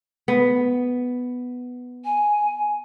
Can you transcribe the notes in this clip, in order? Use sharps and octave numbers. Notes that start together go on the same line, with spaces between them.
B3
G#5